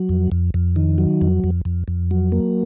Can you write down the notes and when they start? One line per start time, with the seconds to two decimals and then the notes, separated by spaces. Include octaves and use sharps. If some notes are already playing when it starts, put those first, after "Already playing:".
Already playing: F#3
0.09 F2
0.32 F2
0.54 F2
0.76 D#3
0.98 F#3
1.21 F2
1.44 F2
1.65 F2
1.88 F2
2.11 F#3
2.32 A#3